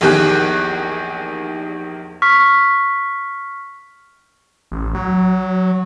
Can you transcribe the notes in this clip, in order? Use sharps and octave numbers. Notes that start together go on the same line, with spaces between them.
A#1 E2 D#3 G4 G#4 F#6
C#6 F6 B6
A1
F#3